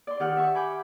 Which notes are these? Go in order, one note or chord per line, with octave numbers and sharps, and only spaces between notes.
D5 C6
D#3 G4 D5 F#5 F6
G4 E5 C#6
G#5 B5 D6 G6